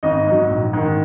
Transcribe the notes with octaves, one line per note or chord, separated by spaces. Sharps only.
G#1 D#4 D#5
G#2 F#3
A#1
G#2 D#3